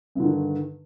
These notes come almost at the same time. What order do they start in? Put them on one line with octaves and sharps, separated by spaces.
G2 D3 D#3